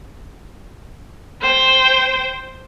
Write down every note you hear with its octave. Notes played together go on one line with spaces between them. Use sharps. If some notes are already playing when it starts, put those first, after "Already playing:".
C5 G5